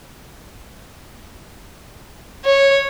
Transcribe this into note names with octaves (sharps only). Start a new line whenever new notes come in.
C#5